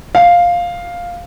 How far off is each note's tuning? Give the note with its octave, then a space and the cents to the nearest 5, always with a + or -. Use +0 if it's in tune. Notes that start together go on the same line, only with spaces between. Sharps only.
F5 +5